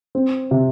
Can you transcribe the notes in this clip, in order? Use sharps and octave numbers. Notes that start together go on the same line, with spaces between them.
C4
C3